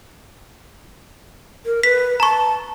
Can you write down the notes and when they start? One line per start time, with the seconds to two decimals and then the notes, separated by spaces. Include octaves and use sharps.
1.65 A#4
1.83 B4 B6
2.20 A5 A#5 C#6